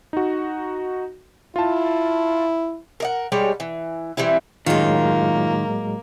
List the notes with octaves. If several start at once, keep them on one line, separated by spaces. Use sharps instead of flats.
D#4 F#4
E4 F4 A5
A#4 D#5 F#5
G3 G#3 C#5 D5
E3
E3 G3 C4 E4
F#2 A2 D#3 F#3 G#3 A#3 F4